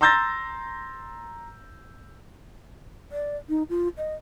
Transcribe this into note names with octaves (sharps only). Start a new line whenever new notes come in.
A#5 C6 E6 G6 A6 A#6
D5
D#4
F4
D#5